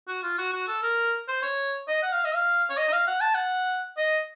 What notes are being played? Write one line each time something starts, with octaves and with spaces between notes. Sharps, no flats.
F#4
F4
F#4
F#4
A4
A#4
C5
C#5
D#5
F#5
F5
D#5
F5
C#5
D#5
D#5
F5
F#5
A5
F#5
D#5